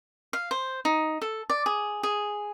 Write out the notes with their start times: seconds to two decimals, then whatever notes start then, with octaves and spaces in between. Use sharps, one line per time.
0.33 F5
0.51 C5
0.85 D#4
1.22 A4
1.50 D5
1.66 G#4
2.03 G#4